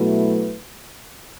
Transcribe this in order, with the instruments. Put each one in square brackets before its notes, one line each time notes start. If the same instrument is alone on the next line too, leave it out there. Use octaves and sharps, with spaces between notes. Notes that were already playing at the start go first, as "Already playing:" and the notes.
Already playing: [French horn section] B2 F#3 A3 E4 B4